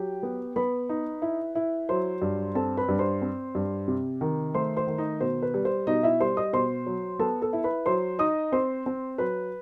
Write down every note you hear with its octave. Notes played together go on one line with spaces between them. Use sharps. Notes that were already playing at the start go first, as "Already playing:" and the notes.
Already playing: F#3 G4 G5
B3
B3 B4 B5
D#4
E4
E4
F#3 C5 C6
G2
C4 A4 A5
B4 B5
G2
C5 C6
C4
G2
C3
D#3
A3 C5 C6
C5 C6
D#3
D#4 D#5
B2 C5
B4
G3
C5
B2 D#4 D#5
E4 E5
G3 C5 C6
D#5 D#6
B2 C5 C6
F#3
B3 A4 A5
A4 A5
E4
B4 B5
F#3 C5 C6
D#4 D#5 D#6
C4 C5 C6
C4
F#3 B4 B5